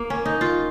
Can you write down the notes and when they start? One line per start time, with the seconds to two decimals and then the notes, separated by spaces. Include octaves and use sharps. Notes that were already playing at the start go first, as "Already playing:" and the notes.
Already playing: A#3
0.10 C#4
0.26 D#4
0.41 F4